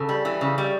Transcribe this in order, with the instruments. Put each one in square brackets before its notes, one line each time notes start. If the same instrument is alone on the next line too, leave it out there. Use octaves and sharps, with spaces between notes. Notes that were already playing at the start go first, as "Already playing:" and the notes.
Already playing: [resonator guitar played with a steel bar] C#3 A4
G3
E3
C#3
G3